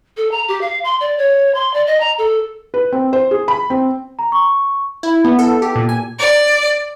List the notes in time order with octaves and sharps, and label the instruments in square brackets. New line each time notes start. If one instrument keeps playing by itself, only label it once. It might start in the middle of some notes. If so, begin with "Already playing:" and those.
[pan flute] A4
A#5
G4
F5
C6
D5
C#5
C6
D5
D#5
A#5
A4
[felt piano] B4
C4
C5
G#4
B5
C4
[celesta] A#5
C#6
[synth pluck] E4
B3
A4
G4
A#2
G#5
[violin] D5